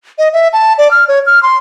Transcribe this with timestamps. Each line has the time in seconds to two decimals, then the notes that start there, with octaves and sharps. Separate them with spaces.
0.18 D#5
0.33 E5
0.53 A5
0.78 D5
0.91 F6
1.08 C#5
1.26 F6
1.43 C6